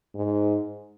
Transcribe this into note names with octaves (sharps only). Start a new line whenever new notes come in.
G#2